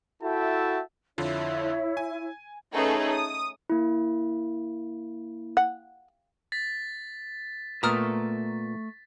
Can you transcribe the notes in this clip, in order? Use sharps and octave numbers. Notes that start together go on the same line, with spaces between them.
E4 F#4 A4 E5 G5 A5
F2 D3 E4 F4 C#5
G#5
A3 C#4 D#4 G#4 A4 B4
D#6
A#3 E4
F#5
A6 B6
A#2 A3 B3 A#4 E5 A#5 D#6 F6